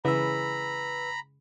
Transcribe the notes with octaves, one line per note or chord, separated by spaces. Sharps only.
C#3 E3 B4 A#5 B5 E6